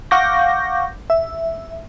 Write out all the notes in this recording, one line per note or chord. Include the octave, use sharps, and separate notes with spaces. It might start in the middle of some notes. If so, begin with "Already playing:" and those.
F5 F#5 C#6 D6 G6 A#6
E5